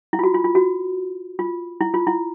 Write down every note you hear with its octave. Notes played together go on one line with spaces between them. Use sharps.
E4
F4
F#4
F4
F4
F#4
F4
E4
F4
E4